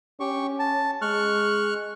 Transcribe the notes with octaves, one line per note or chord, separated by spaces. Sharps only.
C#4 G4 C#6
A5
G#3 C#6 F6 F#6